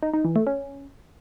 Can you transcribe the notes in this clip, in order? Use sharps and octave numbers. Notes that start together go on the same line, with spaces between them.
D#4
D#4
E3
A3
C#4